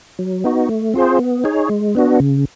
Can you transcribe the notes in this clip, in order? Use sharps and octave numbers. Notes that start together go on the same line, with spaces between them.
F#3
B3 D#4 F#4
A3
C4 F4 G#4 C5
B3
D#4 G#4 C#5
G#3
B3 D4 F#4
C#3